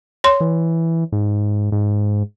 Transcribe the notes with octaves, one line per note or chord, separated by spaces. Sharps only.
C#5 C6
E3
G#2
G#2